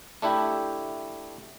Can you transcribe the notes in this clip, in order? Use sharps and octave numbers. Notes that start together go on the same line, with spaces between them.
A3 D4 E4 G4